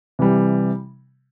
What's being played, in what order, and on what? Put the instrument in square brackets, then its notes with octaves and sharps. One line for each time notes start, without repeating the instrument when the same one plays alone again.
[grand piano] C3 E3 G3